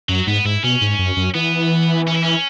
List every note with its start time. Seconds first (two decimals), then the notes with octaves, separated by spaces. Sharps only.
0.09 F#2 F#3
0.27 G#2 B3
0.45 G#2 E4
0.63 B2 C#4
0.82 G#2
0.99 F#2
1.17 F#2
1.34 E3 B3
2.07 C#4
2.15 E4
2.22 C#4